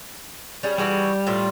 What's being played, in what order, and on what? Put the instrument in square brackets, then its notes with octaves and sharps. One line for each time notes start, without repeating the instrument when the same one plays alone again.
[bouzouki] G3 C#4 G#4
[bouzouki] E3 F#4 G#4 [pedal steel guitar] G3
[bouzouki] A2 F3 F4